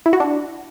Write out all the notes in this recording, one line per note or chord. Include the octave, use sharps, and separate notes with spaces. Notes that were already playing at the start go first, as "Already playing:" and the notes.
E4
F#4
D4